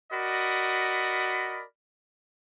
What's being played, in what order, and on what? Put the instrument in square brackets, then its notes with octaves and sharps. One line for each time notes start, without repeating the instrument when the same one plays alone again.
[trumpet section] F#4 A#4 D5 D#5 B5